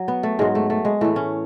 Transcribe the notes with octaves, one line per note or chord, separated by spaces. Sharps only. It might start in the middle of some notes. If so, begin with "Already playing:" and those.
Already playing: F#3
B3
A3
G#2 F#3 G#3
A3
A3
G#3
A2 E3 A3
C#4